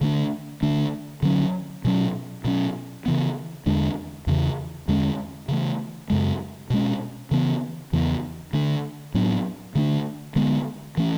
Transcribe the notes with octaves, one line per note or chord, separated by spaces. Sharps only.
D3 A3 D4
D3 A3 D4
D3 F#3 C#4
B2 F#3 C#4
B2 F#3 C#4
C#3 E3 B3
E2 D3 G#3 D4
E2 C#3 E3
E2 D3 G#3 C#4
C#3 E3 A3
F#2 C#3 G#3
B2 G#3 C#4
C#3 E3 B3
E2 C#3 E3 B3
D3 A3 D4
A2 F#3 B3 D4
D3 A3 D4
D3 G#3 B3
E3 A3 C#4